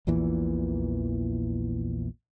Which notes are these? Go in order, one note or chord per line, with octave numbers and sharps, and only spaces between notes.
A#1 E2 A#2 E3